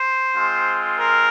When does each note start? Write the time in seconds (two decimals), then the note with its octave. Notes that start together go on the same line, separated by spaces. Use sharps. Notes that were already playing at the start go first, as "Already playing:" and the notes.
Already playing: C5
0.36 G#3 C4 F4
0.98 A#4